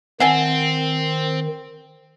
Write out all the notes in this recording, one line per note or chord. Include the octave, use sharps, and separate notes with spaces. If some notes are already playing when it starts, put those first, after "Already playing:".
D#3 C4 E5 F#5 G#5 A5